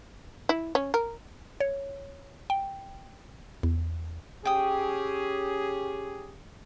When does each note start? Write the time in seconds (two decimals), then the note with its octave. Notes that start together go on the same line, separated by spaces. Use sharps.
0.49 E4
0.75 C#4
0.94 A#4
1.60 C#5
2.50 G5
3.63 E2
4.45 C#4 G4 G#4 G5 D#6